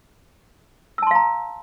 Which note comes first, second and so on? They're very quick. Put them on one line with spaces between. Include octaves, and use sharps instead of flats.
E6 A5 C6 F5 A#5